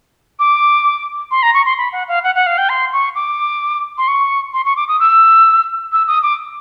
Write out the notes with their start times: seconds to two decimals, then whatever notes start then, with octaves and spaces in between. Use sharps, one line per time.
0.39 D6
1.31 C6
1.43 A#5
1.54 C#6
1.66 C6
1.78 B5
1.92 F#5
2.08 F5
2.24 F#5
2.35 F#5
2.46 F5
2.58 G5
2.69 C6
2.93 C#6
3.15 D6
3.98 C6
4.08 C#6
4.54 C6
4.66 C#6
4.77 D6
4.88 D#6
5.00 E6
5.92 E6
6.08 D#6
6.23 D6